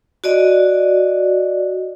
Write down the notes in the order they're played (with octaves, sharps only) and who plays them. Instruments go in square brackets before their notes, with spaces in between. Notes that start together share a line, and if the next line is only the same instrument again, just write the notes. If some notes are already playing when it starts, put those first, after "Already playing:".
[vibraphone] F#4 D5 D#5